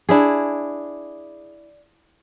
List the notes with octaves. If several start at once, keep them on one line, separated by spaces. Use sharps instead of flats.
D4 E4 G#4